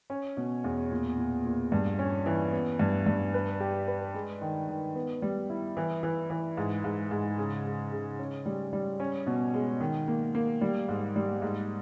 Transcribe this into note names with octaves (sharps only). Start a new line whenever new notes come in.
C#4
B2
E2
A#2
A#2
A#2
G2
C#4
E3
B3
G2
G2
B4
G4
B4
G#3
D#3
D#3
B3
G3
E4
E3
E3
E3
G#2
G#2
G#2
C#3
G#3
C#3
C#4
G3
G3
C#4
B2
G#3
D#3
A#3
A#3
G3
G#2
G3
G#2